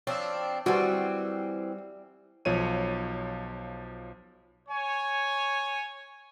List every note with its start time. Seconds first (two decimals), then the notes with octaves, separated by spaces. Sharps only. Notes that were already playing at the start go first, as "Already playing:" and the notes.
0.07 F3 C4 D4 C#5 E6
0.66 E3 G3 C4 F#4 A5
2.45 B1 F3 C#5 D#7
4.69 C#5 G#5